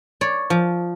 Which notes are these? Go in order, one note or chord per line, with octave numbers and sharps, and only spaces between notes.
C#5 D5
F3